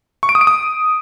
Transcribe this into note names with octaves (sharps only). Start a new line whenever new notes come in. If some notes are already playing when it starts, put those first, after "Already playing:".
C#6
D7
D#6
D7
D#6